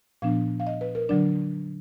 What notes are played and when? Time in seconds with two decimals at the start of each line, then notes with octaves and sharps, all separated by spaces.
0.22 A#2 F3 B3 D4 F5
0.60 F5
0.67 D#5
0.81 B4
0.95 A#4
1.09 D3 F#3 D4 D5